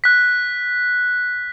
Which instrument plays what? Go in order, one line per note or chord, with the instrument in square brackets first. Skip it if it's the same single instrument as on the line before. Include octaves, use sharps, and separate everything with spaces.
[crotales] F#6 B6